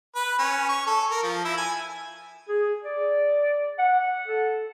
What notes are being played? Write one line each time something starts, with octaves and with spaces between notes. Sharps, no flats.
B4
C#4
C#6
A4
A#4
F3
E4
G#5
G#4
D5
F#5
A4